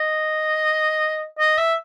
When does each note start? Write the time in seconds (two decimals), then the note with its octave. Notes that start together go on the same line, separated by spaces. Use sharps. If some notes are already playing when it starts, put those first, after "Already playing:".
Already playing: D#5
1.39 D#5
1.58 E5